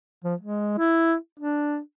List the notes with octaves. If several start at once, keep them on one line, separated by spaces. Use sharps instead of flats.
F3
G#3
E4
D4